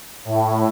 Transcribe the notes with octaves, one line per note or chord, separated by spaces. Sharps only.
A2